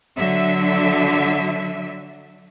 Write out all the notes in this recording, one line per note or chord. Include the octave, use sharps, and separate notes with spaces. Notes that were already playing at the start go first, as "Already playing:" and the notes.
D3 F#3 E5